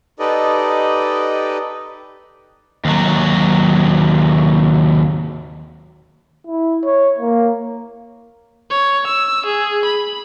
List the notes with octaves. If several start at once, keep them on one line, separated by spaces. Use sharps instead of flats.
D#4 G4 A4 B4 D5 D#5
D#2 F#3
E4
C#5
A#3
C#5
E6
G#4
B5